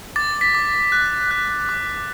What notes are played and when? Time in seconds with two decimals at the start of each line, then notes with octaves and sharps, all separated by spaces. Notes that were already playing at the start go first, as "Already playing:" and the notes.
0.16 D6 A6
0.41 B6
0.55 D6
0.92 F#6
1.31 F#6
1.69 D6